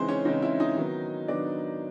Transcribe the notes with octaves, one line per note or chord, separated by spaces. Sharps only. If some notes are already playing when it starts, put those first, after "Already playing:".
Already playing: C#3 E3 G#3 C4 D#4 C5
C#4 C#5
C#3 E3 G#3 C4 D#4 D#5
E4 E5
D#4 D#5
D#3 F#3 B3
D#3 F#3 B3 D4 D5